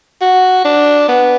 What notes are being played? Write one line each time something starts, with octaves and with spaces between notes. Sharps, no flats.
F#4
D4
B3